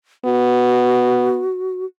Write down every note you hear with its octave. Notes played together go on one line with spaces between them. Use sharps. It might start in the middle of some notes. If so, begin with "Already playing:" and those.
B3 F#4